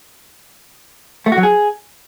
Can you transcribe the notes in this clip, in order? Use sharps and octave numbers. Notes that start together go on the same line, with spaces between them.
A3
F#4
F#3
G#4